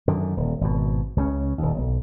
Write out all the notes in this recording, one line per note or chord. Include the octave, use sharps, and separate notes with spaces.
F#2 D3 D#3
D#1
G#1 B2
C#2 C#3 E3 C#4
D#1 D#2
B1